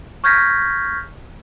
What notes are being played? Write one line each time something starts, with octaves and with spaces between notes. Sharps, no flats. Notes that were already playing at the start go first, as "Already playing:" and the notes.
C#6 F6 G6 G#6 A#6 B6